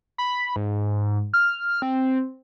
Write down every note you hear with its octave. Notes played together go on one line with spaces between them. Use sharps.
B5
G#2
F6
C4